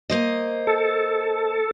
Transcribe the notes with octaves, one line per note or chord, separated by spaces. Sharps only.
A#3 C5 D#5
A4